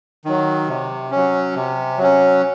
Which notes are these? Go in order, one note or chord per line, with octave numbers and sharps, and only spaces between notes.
D#3 F#3
C3
F#3 C#4
C3
F#3 C#4